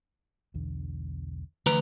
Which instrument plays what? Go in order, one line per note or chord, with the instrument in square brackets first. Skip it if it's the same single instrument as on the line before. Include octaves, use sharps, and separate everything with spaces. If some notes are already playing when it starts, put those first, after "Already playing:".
[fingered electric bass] B1 E2 D3
[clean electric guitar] D2 B4 A#5 [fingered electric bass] E3 F3